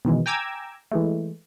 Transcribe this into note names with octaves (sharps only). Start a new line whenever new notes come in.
B2 D#3 E3 G#3
G5 G#5 A#5 D6 E6 G#6
E3 G#3 A3